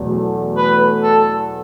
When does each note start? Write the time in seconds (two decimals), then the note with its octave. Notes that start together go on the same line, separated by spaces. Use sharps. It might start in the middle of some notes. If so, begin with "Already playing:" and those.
Already playing: E2 B2 F#3 A3
0.57 B4
1.03 A4